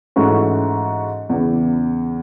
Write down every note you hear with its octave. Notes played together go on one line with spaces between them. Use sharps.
G#2 E3 A3 C#4 F#4
E2 C#3 E3